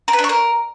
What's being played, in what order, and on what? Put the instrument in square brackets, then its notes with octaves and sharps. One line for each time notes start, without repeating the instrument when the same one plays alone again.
[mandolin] A#4
B4
D4
C#5
A#4